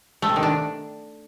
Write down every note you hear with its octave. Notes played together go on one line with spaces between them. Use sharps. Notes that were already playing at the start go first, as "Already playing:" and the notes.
A3
C3
D#3
D4